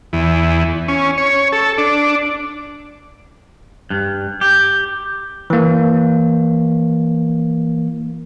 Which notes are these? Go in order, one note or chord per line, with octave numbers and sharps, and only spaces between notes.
E2
C#4
C#5
A4
D4
G2
G4
E3 A#3